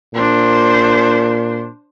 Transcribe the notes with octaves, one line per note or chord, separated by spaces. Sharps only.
A#2 D4 C5